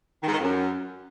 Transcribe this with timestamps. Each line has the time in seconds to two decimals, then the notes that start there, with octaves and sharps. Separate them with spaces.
0.22 D#3
0.27 G#2
0.32 D#3
0.37 F2
0.43 F#2